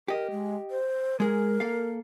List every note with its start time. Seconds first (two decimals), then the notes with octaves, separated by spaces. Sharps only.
0.08 G4 A#4 D#5
0.31 G#3
0.71 C5
1.20 G#3 G#4 A#4
1.60 A#3 A4 F5